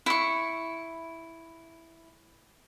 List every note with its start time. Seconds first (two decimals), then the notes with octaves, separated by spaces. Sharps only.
0.06 E4 C#6